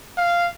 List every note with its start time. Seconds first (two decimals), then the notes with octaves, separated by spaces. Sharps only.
0.18 F5